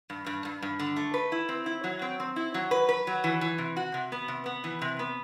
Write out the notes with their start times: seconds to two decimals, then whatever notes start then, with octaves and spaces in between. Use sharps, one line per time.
0.10 G2
0.26 G2
0.45 G2
0.62 G2
0.79 D3
0.96 A3
1.14 B4
1.32 E4
1.49 C4
1.66 E4
1.84 F#3
2.02 C4
2.20 C4
2.36 E4
2.54 F#3
2.71 B4
2.89 B4
3.07 F#3
3.24 E3
3.41 E3
3.58 C3
3.77 F#4
3.94 C3
4.12 B3
4.28 C3
4.46 B3
4.64 E3
4.82 C3
4.99 B3